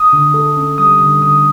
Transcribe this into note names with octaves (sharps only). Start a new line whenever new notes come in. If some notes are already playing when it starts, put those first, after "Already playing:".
Already playing: D#6
D3
A4
C#4
G3 D#6
D3
D3 D#6